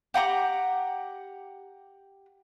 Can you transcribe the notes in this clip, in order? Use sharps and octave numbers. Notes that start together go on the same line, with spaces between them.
G4 F#5 A#5 D6